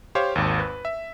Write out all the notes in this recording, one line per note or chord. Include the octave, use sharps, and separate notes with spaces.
G4 C5 C#5 F5
G#1 D#2
B4
E5